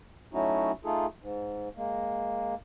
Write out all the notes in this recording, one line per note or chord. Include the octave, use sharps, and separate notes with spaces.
F#3 A3 C#4 D#4 E4 F#4
A3 D#4 F4 G#4 A4
G#2
G#3 A#3